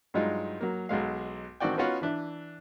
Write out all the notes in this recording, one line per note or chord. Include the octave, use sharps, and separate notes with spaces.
G2 F#3 G#3 D#4 F4
F#3 A#3
B1 F#3 G#3 F5
A1 D#3 C4 F#4 D5 G5
B3 C#4 D#4 F4 F#4 C#5
E3 D4 E5